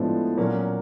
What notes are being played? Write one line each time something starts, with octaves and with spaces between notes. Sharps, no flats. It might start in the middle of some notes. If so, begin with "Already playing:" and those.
Already playing: A2 F3 G#3 B3 D4
A#2 F#3 A#3 C#4